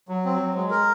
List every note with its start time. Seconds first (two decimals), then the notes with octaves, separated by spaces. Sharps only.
0.09 F#3
0.25 C4
0.40 F#3
0.55 G#3
0.70 A#4